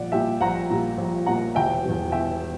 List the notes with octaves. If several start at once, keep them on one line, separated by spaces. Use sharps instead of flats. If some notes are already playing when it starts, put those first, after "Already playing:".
Already playing: A#1 A#2 G3 D5 F#5
A#2 G3 E5 G5
A#1 F#5 A#5
A#2 G3
A#1
A#2 G3 F#5 A#5
E1 E5 G5
E2 B2 G3
E1 E5 G5